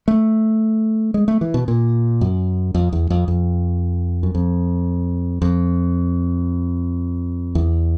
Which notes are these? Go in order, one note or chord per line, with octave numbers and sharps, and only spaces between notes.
A3
G#3
A3
E3
B2
A#2
F#2
F2
E2
F2
F2
F#2
F2
F2
E2